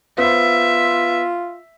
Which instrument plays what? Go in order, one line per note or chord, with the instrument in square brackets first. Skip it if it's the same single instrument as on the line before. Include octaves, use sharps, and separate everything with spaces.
[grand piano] B3 C5 [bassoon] F4 [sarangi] E5